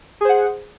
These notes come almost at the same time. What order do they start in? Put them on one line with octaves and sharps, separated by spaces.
G#4 C5 F#5